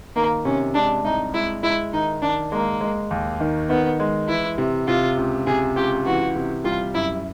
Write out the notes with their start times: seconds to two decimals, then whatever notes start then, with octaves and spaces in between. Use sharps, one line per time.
0.16 D#3 A#3
0.45 C3 C#4
0.75 G#3 D4
1.04 C2 D#4
1.34 G#3 E4
1.63 G#3 E4
1.93 D#3 D#4
2.22 D#3 D4
2.52 G#3 A#3
2.81 G#3
3.11 D#2
3.40 D#3
3.69 D#3 B3
4.00 G#3
4.29 E3 E4
4.58 C3
4.88 C3 F4
5.17 C#2
5.47 C3 G#4
5.76 C#2 G4
6.06 E3 F#4
6.36 C3
6.64 G3 F4
6.95 F#2 E4